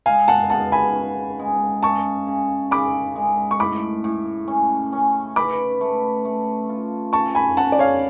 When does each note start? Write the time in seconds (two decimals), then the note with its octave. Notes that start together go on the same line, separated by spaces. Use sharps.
0.06 G#3 F5 G#5
0.28 F#5 A5
0.50 B2 F#5 A5
0.72 G#5 B5
0.95 C#4
1.39 G#3
1.83 C#3 A5 C#6
2.27 C#3
2.71 C#3 B5 D6
3.15 G#3
3.51 C#6
3.59 A2 B5 D6
4.04 A2
4.48 C#4
4.92 C#4
5.36 B4 B5 D6
5.81 A3
6.25 A3
6.69 F4
7.13 C#3 A5 C#6
7.35 G#5 B5
7.57 C#4 F#5 A5
7.72 D5
7.79 C#5 F5